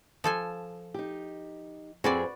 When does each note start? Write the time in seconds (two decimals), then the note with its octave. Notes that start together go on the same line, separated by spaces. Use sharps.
0.24 F3 A4 G#5
0.94 D#4 G4
2.04 F2 C4 F#4 G#4 B4 D5